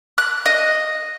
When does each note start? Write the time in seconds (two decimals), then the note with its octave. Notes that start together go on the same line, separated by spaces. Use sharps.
0.18 F#6
0.46 D#5